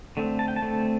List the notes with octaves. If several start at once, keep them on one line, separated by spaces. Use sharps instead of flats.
D3 A3 C4
A5
G5
A5
D3 A3 C4